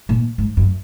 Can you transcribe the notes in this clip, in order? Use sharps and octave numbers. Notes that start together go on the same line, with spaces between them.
A#2
G#2
F#2